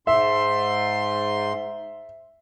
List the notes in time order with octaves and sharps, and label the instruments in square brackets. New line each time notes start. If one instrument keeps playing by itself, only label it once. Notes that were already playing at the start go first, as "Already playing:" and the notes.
[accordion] G#2 C6 [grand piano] E5